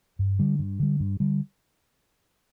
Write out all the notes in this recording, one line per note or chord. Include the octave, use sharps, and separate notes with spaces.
G2
D3 G3
G2
D3 G3
G2
D3 G3